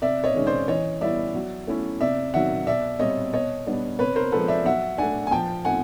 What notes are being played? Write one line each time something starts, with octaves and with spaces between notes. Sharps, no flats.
C3 D5 E5
C#5 D#5
D#3 G#3 C#4
C5 D5
E3 C#5 D#5
G3 B3 E4 D5 E5
F#3
A3 C#4 E4
C3 D5 E5
D#3 F#3 E5 F#5
B2 D5 E5
G3 C4 C#5 D#5
B2 C#5 D#5
G3 B3 D4
C3 B4 C#5
A#4 C5
F3 G#3 B3 A4 B4
D5 E5
F#3 E5 F#5
A3 D4 F#5 G#5
G#5
F3 G5 A5
A3 C4 D#4 F#5 G#5